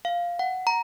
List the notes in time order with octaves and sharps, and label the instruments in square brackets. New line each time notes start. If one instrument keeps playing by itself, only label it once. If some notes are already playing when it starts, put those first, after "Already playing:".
[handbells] F5
F#5
A#5